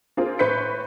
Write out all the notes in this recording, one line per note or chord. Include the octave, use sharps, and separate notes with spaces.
A#3 C4 F4 G#4
A2 B4 C5 G6 B6 C#7